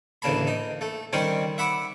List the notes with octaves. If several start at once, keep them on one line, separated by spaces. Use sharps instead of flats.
A1 D2 C#3 A#3 A5 B5
D#4
A3
D#3 G3 C4 C#4
E5 F#5 B5 D6